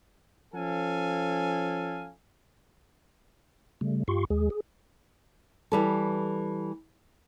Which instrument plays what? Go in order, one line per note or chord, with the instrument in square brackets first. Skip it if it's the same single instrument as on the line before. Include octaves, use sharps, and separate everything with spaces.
[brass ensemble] F3 C#4 A4 F5 G#5
[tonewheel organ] C#3 G3 A3
G2 F4 G4 C6 C#6
D#2 G#3 G#4
G#4
[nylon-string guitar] E3 G3 A4